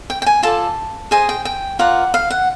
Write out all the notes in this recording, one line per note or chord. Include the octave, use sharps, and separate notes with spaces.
G5
G5
G#5
F4 A4 D5 A5
G#4 C5 D#5 G#5
G5
G5
F4 A#4 D5 F#5
F5
F#5